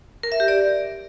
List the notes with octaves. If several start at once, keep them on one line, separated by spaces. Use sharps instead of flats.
A#4
E5
G4
D5